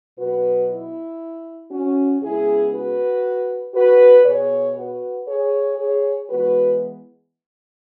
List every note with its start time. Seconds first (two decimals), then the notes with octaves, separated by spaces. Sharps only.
0.18 B2 F#3 B3 F#4 B4
0.70 E4
1.71 C#4 F#4
2.22 C#3 G#3 B3 E4 G#4
2.73 F#4 B4
3.75 F#4 B4
4.25 B2 B3 G#4 C#5
4.76 F#4 B4
5.28 G#4 C#5
5.78 G#4 C#5
6.30 E3 G#3 B3 F#4 B4